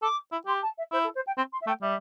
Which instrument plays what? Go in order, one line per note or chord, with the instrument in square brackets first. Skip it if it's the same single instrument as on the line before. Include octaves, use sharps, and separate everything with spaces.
[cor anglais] A4 [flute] D6
[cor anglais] E4
[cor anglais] G4 [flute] C6
[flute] A5
E5
[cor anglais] E4 [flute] C5
[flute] A4
C5
G5
[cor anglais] C4 [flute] C6
[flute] C6
E5
[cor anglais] A3 [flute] G5
[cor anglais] G3 [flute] E5